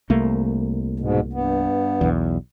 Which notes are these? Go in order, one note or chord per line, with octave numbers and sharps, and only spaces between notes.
C2 A3 A#3
G#2 B2
G2 B3
B1 E2